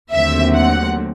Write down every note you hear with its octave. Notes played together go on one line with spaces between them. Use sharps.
D#2 D3 F#3 A3 C4 E5
F#5